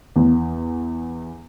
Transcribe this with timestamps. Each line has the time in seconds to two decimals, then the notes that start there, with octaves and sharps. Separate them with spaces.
0.16 E2